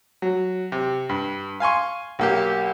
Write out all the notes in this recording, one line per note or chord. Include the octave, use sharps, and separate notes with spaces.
F#3
C3
G2
F5 G#5 C6 C#6
B1 A#3 G4